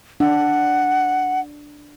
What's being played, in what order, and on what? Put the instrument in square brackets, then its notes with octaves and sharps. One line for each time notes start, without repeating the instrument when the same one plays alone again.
[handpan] D4 [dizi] F#5